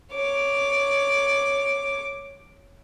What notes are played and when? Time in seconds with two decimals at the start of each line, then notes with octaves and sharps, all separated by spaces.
0.14 C#5 D6